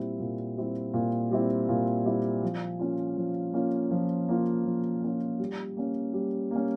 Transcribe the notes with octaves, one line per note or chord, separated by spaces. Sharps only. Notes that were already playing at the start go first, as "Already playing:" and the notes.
Already playing: A#2 G3 C4 E4
A#2
G3 C4 E4
A#2
G3 C4 E4
A#2
G3 C4 E4
F3
A#3 C#4 F4
F3
A#3 C#4 F4
F3
A#3 C#4 F4
F3
A#3 C#4 F4
G3
A#3 C#4
G3
A#3 C#4